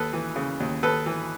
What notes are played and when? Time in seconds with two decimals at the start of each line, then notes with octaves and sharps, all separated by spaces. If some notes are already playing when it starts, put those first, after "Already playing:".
Already playing: D#2 A4 B4
0.13 E3
0.36 C#3
0.60 D#2
0.83 D#2 A4 B4
1.06 E3